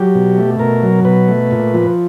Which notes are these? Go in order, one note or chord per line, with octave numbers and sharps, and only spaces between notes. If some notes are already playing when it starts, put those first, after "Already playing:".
Already playing: F#3 G4
B2
A3
B2 A#4
F#3
B2 B4
A3
A#2
F3